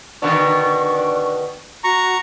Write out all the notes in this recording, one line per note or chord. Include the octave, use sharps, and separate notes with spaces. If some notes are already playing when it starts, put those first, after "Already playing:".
B2 D3 D#3 D4 C#6
F#4 A#5 C#6